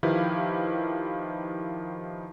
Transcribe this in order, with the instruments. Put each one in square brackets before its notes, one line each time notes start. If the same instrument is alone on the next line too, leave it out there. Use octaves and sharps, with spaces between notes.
[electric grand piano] D#3 F3 E4 G4 B4 F5